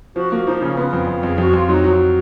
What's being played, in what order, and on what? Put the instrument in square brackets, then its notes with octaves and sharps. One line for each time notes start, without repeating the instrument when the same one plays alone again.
[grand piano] F3 [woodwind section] F#4
[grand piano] A#3 [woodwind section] F#4
[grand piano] F3 [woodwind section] D#4
[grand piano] C#3 [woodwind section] C#4
[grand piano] B3 [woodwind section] F4
[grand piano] F2
F2
[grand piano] F2 [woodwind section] G#4
[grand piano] F2 [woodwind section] F#4
[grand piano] F2 [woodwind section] F4
[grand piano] F#3 [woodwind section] D#4
[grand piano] F#3